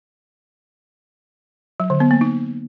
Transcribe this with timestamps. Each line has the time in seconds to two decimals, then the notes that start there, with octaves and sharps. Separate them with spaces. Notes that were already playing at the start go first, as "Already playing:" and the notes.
1.80 F#3
1.90 D3
2.00 B3
2.11 A#3
2.21 D#4